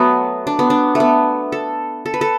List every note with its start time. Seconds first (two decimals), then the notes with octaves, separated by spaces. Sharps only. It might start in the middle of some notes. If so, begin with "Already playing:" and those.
Already playing: F#3 A3 B3
0.47 D4
0.59 B3
0.70 D4
0.95 A3
1.00 B3
1.52 A4
2.06 A4
2.14 B4
2.21 A4